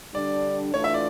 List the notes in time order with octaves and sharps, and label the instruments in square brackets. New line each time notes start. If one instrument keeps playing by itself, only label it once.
[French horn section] D3 G3 D4 [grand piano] D5
[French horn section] E3 A3 D4 F4 [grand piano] C#5
[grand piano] E5
D5